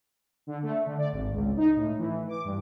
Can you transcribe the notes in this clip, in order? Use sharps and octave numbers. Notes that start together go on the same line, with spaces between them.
D3
A3
D3
D5
G#1
C#2
D#4
A2
E3
D6
G2